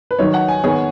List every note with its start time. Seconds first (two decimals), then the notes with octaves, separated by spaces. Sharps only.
0.11 B4
0.19 D#3 F#3 D#4 C#5
0.34 F#5
0.48 G#5
0.63 D#3 B3 G#4 C#5